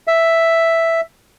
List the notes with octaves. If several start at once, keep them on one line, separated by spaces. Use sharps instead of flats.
E5